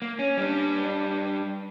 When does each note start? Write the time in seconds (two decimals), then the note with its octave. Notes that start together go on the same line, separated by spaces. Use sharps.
0.02 A#3
0.19 C#4
0.37 G3 D4